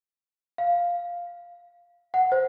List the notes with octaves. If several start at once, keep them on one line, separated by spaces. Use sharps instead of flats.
F5
F#5
C5